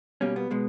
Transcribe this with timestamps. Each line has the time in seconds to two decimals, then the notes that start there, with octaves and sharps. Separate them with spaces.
0.21 B2 G3 A#3 C#4
0.36 B3
0.51 B2 G#3 B3